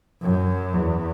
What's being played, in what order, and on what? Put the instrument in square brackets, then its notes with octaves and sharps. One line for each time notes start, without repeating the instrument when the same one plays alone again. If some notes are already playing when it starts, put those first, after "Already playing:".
[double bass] F#2
E2